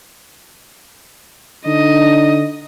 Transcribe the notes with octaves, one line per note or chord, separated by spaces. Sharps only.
D3 D4 D#4 D#5